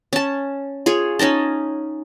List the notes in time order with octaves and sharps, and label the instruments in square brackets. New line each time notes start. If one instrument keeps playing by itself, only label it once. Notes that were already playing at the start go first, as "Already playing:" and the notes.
[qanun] C#4 A5
F4 G#4 C#5
C#4 D#4 D#5 A5